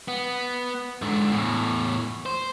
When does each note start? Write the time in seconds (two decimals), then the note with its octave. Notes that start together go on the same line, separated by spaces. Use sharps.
0.08 B3
1.02 G#2 D3
1.32 E2 A2
2.26 C5